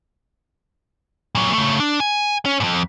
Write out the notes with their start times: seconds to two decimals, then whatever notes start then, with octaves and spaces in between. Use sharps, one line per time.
1.35 A#2 F#3
1.53 C#3 A3
1.80 D4
2.00 G#5
2.46 C#4
2.60 F2 G#2